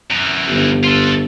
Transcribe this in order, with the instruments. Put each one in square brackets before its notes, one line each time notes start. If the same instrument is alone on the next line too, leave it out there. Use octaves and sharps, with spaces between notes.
[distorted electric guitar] F#2 E3
[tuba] G1
[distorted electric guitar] F4 A4